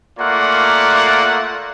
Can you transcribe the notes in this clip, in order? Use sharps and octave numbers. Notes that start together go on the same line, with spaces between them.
A3 A#3 F4 D5 F#5